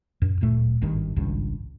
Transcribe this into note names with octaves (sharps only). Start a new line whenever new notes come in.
F#2
D1 A#2 A3
G#1 G2 D#3
G#1 C#2 G2